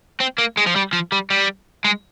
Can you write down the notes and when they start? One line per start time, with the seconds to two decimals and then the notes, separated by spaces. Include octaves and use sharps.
0.21 C4
0.38 A#3
0.57 G#3
0.66 F3
0.76 G3
0.93 F3
1.12 G3
1.30 G3
1.85 G#3